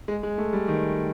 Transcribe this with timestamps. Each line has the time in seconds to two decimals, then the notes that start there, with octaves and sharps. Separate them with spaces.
0.08 G#3
0.23 G#3
0.38 A3
0.53 G3
0.68 D#3